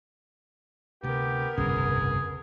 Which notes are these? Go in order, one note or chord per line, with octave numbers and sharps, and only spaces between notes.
D2 C3 B3 G4 A#4
G1 C2 F2 A2 C#3 C#4 G#4